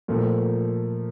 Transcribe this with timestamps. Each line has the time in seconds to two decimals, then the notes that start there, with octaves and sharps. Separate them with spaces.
0.08 A#2 F3 A3